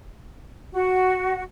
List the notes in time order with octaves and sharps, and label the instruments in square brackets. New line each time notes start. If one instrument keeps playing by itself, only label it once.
[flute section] F#4